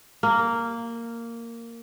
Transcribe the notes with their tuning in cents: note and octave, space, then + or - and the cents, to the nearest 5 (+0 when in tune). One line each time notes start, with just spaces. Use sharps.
A#3 -10